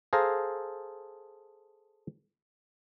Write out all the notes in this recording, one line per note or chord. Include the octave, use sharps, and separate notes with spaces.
G#4 A4 C5 F5 A#5